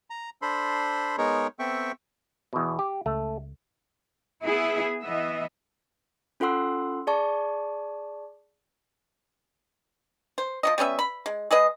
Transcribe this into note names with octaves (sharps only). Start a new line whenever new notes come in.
A#5
D4 A4 C5 B5 C6
G#3 B3 D#4 G#4 A#4 C#5
B3 C4 A4 E5 G5 C#6
E2 B2
G4
C#2 A3
B3 E4 G#4
E3 B3 D#5 E5
C#4 F4 A4 F#5 C6 E6
G#4 D5 A5 C#6
C5
F3 F#3 D#5
G3 B3 C#4 E5
B5
G#3
G#3 G#4 B4 D#5